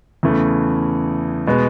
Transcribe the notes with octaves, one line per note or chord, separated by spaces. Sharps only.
E2 C#3 E3 A3
B2 G#3 B3